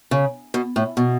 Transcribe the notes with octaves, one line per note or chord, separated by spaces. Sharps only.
C#3
B2
A2
B2